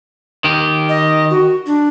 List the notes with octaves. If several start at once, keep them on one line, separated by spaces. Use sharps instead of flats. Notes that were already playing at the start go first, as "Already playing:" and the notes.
D#3 G4
D#5
F#4
D4